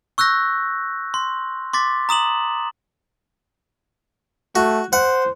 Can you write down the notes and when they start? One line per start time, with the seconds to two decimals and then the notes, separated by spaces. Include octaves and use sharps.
0.18 C#6 E6 F#6 G6 A#6
1.14 C6
1.73 C6 D6 A6 B6
2.09 A#5 D#6 E7 F#7
4.56 A3 F#4
4.93 C5 F#5